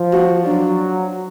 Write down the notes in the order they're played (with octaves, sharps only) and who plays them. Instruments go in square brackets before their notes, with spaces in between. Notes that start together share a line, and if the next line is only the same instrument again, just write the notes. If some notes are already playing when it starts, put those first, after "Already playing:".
Already playing: [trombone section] F3
[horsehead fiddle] F#4
[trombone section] F#3 [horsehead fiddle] D4